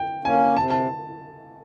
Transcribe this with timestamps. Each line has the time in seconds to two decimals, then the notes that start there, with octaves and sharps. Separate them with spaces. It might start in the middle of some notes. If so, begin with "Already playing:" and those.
Already playing: G5
0.24 A#3 C#4 G#5
0.56 C3 A5
0.70 A5